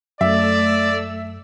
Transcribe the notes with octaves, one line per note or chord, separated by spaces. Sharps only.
F#2 A3 D5 E5 E6